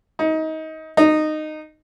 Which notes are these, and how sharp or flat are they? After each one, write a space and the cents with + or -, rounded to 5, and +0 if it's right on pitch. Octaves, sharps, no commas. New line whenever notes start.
D#4 +25
D#4 -15